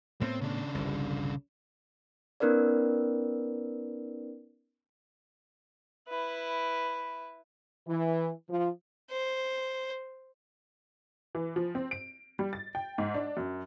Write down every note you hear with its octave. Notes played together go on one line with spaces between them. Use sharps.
A2 B3 C4
C#3 D4
G1 C2
B3 C#4 D#4 A#4 B4 D5
E4 B4
E3
F3
C5
E3
F3
C4
D7
G3
A6
G5
G#2
D4
F#2